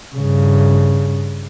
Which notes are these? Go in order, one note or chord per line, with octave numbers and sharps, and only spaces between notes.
G2 C#3